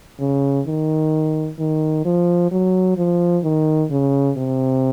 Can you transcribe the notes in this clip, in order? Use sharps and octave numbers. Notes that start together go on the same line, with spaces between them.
C#3
D#3
D#3
F3
F#3
F3
D#3
C#3
C3